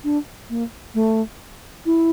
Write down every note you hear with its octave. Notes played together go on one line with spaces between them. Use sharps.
D4
A#3
A3
E4